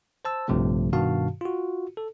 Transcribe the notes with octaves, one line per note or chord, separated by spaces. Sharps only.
C5 A5 E6
A#1 G2 C3 F3 A3
G2 B2 D#3 F#4 F5 A5
F4 F#4
A4